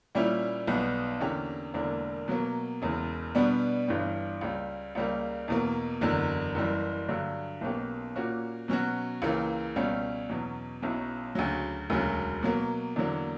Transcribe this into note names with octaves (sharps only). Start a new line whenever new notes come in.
A#2 G3 C#4 E4
B1 B2 G3 B3
E2 D3 A#3 C#4 G4
E1 E2 D3 A#3 D4
B2 F#3 A#3
E1 E2 C#3
B2 G3 B3 D4
G1 G2 E3 G3
C#2 C#3 G3
C#2 C#3 G3 A#3
E2 B2 A#3
F#1 E2 D3 F#3
F#1 F#2 E3 G3
G2 D3 F#3
B1 B2 A#3 C#4 G4
A#2 A#3 C#4 F#4
B2 F#3 C#4 F#4
C#2 C#3 E3 A#3
C#2 B2 G3 C#4
E2 B2 F#3 C#4
B1 B2 F#3 C#4 E4
D2 C#3 F#3
E1 D2 C#3 F#3
B2 F#3 A#3
E2 D3 F#3 A#3